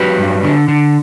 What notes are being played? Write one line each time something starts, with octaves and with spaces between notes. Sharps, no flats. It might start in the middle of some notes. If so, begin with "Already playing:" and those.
Already playing: F#3 G4 B4
G2
D3
D3